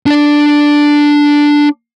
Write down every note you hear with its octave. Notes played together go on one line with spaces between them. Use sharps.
D4 D5